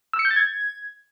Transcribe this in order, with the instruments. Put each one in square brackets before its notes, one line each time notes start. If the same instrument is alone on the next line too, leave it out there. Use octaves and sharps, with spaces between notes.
[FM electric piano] E6
C#7
G6
A6
G#6